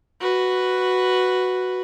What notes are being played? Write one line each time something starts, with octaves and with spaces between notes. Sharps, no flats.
F#4 B4